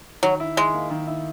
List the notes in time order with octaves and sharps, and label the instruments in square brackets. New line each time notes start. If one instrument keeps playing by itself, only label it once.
[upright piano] D#3 [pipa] F#3
[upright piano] E4
[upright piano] D#3 [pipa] G#3
[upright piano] A#3
D#3
E4